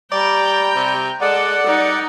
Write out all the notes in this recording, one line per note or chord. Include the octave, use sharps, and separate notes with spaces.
G3 D5 G5 A#5
C3
G#3 A4 D5 F#5
G3 D#4